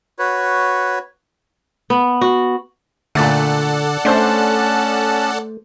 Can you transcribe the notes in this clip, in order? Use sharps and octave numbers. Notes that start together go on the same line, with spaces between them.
F#4 B4 C#5
B3
F#4
A#2 D3 A3 A4 D5 F#5
A3 C#4 D4 C5 A5 F#6